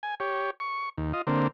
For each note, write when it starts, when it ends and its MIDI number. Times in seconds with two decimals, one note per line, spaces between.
0.03 0.15 80
0.20 0.50 67
0.20 0.50 73
0.60 0.89 85
0.98 1.13 39
1.13 1.22 65
1.13 1.22 75
1.27 1.47 50
1.27 1.47 58
1.27 1.47 60